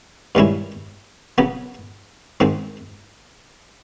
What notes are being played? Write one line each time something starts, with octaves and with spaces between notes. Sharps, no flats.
G2 D#3 G#3 C#4 E4
C#3 F#3 B3
G#2 D#3 G#3 C4